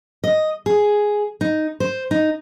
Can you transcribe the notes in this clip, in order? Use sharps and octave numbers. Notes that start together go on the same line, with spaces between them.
D#5
G#4
D#4
C5
D#4